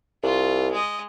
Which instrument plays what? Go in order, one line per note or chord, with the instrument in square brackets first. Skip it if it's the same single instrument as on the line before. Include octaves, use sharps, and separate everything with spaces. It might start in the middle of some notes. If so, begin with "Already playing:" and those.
[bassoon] C2 [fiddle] F4
[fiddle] G#3 D#5